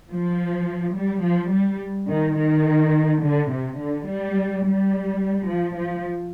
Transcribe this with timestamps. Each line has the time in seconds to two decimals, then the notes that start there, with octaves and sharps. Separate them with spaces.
0.09 F3
0.94 G3
1.23 F3
1.50 G3
2.08 D#3
2.36 D#3
3.21 D3
3.50 C3
3.78 D3
4.07 G3
4.63 G3
5.47 F3
5.76 F3